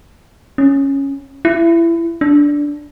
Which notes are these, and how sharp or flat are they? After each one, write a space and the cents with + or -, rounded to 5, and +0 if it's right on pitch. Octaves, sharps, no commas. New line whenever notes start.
C#4 -5
E4 +25
D4 -10